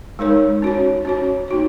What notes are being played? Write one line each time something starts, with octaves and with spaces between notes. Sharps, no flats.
G#3 D#4 A#4 C#5
C#4 F#4 C#5
C#4 F#4 C#5
A#3 D#4 F#4 C#5